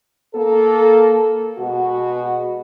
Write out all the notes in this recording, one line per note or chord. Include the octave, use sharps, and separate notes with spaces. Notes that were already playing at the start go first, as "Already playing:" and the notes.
A#3 A4
B2 G#3 F#4